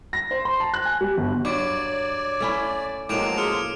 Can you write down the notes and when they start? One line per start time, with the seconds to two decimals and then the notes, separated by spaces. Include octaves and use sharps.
0.13 A#6
0.31 C5
0.45 C6
0.60 A5
0.74 F#6
0.85 G#5
1.01 G3
1.17 G1
1.45 G2 F#3 C#5 D5 D6 D7
2.40 A3 C#4 E4
3.09 A2 F3 F#3 G#3 A#3 D6 D7 F7
3.37 G#4 F6 C#7 F7